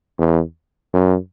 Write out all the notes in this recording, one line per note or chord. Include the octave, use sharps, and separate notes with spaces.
E2
F#2